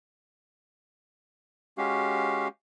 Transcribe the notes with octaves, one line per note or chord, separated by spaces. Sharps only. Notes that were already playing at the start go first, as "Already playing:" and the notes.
G#3 C#4 F#4 G4 F5